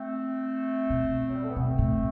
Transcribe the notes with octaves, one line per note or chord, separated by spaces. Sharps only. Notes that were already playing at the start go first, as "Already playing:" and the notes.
Already playing: A3 C4
B2
F#3
G3
A3
B3
B2 A3 C4
A2